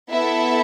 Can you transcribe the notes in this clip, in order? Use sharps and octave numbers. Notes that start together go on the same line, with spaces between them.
B3 E4 A4 E5